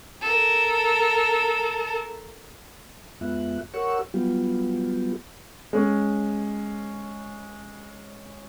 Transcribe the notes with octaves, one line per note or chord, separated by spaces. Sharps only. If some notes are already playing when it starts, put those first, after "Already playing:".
A4 A#4
F2 G#3 B3 F4 E5 F#6
G4 A#4 C#5 F#5 C#6 E6
F#3 G3 B3 F4 G4
G#3 C#4